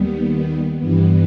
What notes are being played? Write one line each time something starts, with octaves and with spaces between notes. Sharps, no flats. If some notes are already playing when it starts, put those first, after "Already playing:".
Already playing: D#2 D#3 G3 B3
G2 E3 G3 B3